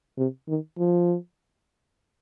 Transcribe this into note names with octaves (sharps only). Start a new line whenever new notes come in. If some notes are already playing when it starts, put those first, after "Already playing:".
C3
D#3
F3